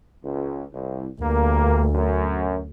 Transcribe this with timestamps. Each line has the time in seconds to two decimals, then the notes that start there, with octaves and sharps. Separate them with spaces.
0.23 C#2
0.72 C2
1.20 D2 G2 A#3
1.94 F#2